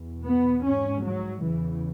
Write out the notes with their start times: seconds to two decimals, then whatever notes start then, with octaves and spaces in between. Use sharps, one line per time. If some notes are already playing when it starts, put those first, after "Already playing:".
Already playing: E2 B2
0.25 B3
0.64 G#2 C#4
1.03 F#3
1.42 E2 C#3 E3